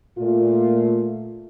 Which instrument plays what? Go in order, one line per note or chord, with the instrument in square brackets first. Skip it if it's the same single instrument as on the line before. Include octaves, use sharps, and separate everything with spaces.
[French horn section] A#2 A3 F4